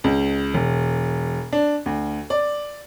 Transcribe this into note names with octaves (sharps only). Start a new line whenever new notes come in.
C#2
E1
D4
D2
D5